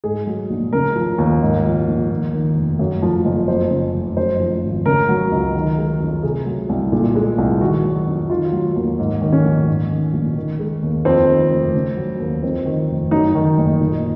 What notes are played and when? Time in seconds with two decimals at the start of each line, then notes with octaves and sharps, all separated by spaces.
0.04 G#2 G#4
0.27 F#3
0.50 A#1
0.73 C#3 A#4
0.96 F3
1.18 D#2
1.42 G#2
1.64 F3
1.87 A#1
2.10 D#2
2.33 D#3
2.56 F1
2.79 F#2
3.02 F3
3.25 F#1
3.48 F2 C5
3.71 C#3
3.94 F1
4.17 F#2 C5
4.40 F3
4.63 G#1
4.85 C#3 A#4
5.09 F#3
5.31 C#2
5.55 D#3
5.78 G#3
6.00 F2
6.23 C3 G#4
6.47 F#3
6.69 C2
6.92 A#2
7.15 G#3
7.38 C2
7.61 D#3 F#4
7.84 F#3
8.07 F2
8.30 D#3 F4
8.53 F#3
8.76 D#2
8.99 G#2
9.21 D#3
9.33 C#4
9.45 A#1
9.67 G#2
9.91 D#3
10.13 A#1
10.36 D#3
10.59 G#3
10.83 D#2
11.05 F2 C4
11.28 D#3
11.51 F1
11.74 C#3
11.97 F#3
12.20 D#2
12.43 F2 C4
12.66 D#3
12.89 F1
13.11 F#2 D#4
13.35 D#3
13.58 F#1
13.81 A#2